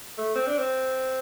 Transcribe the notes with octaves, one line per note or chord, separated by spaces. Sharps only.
A3
C4
D4
C4